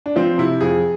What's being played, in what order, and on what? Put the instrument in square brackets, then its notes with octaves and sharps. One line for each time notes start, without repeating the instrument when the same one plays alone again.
[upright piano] D4
F3 C4
C3 E4
F2 G#4